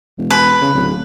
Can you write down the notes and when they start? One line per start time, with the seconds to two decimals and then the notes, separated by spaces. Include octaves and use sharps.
0.18 E1
0.31 B4
0.62 C#3
0.75 D1